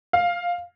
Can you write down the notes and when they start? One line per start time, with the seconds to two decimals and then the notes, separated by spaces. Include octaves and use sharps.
0.13 F5